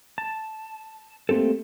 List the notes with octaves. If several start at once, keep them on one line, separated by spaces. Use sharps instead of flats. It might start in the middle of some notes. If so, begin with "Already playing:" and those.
A5
A3 A#3 C4 G4 A4